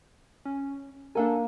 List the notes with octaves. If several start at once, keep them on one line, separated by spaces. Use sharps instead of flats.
C#4
A#3 D4 A4 A#4 G#5